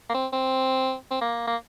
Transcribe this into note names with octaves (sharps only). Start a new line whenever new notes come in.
A#3
C4
C4
C4
A#3
A#3